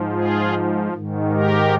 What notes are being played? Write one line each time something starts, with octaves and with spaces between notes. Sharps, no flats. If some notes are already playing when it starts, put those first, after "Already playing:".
Already playing: G#2 F3
F4 G#4
G#2 D#3
G4 A#4